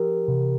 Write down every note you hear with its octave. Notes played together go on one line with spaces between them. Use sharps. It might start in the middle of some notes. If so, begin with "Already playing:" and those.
Already playing: F3 G4 A#4
C3 E3